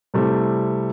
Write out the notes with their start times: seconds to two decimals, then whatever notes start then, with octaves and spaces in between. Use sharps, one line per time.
0.14 C3 G3 A3 C4 E4